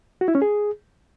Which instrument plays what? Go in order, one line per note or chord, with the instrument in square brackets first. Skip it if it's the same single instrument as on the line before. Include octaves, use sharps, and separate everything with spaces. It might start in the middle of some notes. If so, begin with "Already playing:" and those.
[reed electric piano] F#4
E4
C#4
G#4